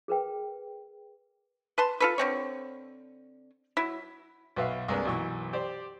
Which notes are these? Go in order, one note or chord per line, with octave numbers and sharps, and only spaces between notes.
G#4 A#4 B4 G5
B4 A5 C6
F4 A4 B4
D3 C4 C#5
F#3 E4
B1 F#4 B4 E5 F5
C2 G#3 A#3 D4 B4
B1 F#2 E3 C#6
G4 C5 D5